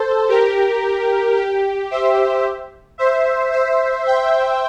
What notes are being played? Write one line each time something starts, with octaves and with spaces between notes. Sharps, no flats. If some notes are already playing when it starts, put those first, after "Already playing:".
Already playing: A4 C5
G4 A#4
G4
C5 E5
C5 E5
C5 E5
E5 G5